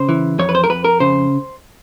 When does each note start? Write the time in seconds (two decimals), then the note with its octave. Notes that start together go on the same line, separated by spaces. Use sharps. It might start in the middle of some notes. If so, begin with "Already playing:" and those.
Already playing: C#3 C5
0.09 E3
0.39 F2 C#5
0.49 B4
0.55 C5
0.64 A#4
0.69 F2 B4
0.84 A#4
1.00 C#3 C5